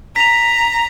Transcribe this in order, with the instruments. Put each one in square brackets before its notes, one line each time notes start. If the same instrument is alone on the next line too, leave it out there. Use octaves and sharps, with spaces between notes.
[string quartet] A#5 [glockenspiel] B6 F7